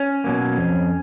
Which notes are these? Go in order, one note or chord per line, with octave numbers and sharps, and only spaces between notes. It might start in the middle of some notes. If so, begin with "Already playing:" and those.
Already playing: C#4
B2 F#3 A#3
F2